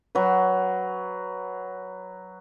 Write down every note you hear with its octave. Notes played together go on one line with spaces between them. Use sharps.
F#3 B4